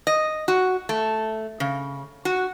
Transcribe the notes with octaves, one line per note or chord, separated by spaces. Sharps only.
D#5
F#4
A3
C#3
F#4